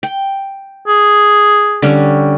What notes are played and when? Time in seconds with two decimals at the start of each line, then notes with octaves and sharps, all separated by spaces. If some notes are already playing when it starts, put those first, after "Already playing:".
0.03 G5
0.88 G#4
1.82 D3 G3 C#4